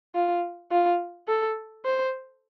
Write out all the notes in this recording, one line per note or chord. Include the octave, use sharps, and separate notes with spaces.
F4
F4
A4
C5